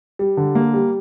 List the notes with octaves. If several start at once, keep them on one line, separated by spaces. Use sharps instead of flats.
G3
D3
A#3
G3